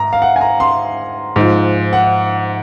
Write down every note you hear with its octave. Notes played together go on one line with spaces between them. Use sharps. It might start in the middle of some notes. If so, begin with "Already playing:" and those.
Already playing: G#2 A#5
F5
F#5
G#5
A#5
C6
G#2 F3
F#5